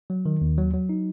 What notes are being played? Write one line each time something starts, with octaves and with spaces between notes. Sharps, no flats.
F#3
D#3
D#2
F#3
F#3
D#4